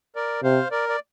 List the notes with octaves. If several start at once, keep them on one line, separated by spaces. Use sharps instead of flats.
A#4 D5
C3 C5 F5
A#4 D5
D5